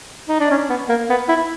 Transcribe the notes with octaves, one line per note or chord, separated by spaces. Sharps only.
D#4
D4
C#4
B3
A#3
B3
E4